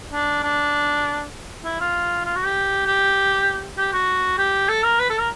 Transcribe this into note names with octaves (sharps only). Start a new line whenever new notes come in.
D4
D4
E4
F4
F4
F#4
G4
G4
G4
F#4
G4
A4
A#4
B4
A4
A#4